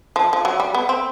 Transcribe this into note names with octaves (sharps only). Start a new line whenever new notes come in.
F3
F3
F#3
G3
B3
C4